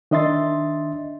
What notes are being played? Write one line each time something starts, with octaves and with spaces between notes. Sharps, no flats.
D#3 D4 D#5 E5 C6 A6